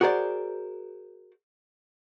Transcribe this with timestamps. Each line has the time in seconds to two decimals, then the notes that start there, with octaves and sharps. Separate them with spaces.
0.01 F#4 G#4 A#4 C5 D5